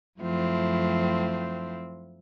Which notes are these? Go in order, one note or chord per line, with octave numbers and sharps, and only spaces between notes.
F#2 F3 A3 C4 E4 F4